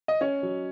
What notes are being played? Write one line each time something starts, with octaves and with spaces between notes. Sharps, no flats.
D#5
C#4 C#5
F#3